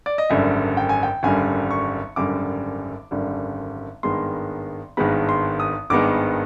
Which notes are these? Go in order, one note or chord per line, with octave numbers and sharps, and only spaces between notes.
D5
D#5
G#1 F#2 D3 G3 E5
G5
G#5
G5
G#1 F#2 D3 G3 G#5
C#6
G#1 F#2 D3 G3 D6
G#1 F#2 D3 G3
G#1 G2 D#3 G#3 B3 C6
G#1 G2 D#3 G#3 B3 B5
C6
D#6
G#1 G2 D#3 G#3 B3 D6